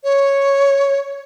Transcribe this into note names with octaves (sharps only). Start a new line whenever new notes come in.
C#5